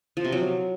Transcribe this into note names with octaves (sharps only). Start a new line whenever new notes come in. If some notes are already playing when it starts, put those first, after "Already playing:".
F3
C3
F#3